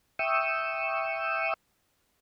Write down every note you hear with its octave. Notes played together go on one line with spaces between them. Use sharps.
E5 G5 C#6 D#6 E6